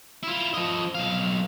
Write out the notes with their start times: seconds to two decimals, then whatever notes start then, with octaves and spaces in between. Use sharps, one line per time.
0.23 E4 F4
0.54 F3 D#5
0.95 B1 F5